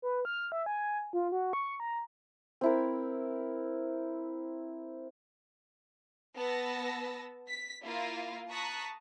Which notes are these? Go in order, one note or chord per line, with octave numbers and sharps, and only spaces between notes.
B4
F6
E5
G#5
F4
F#4
C#6
A#5
C4 E4 A#4
B3 A5 E6 A#6
B6
A#3 E4 F4 A#4 F5
A5 A#5 C#6 D#6 F#6 B6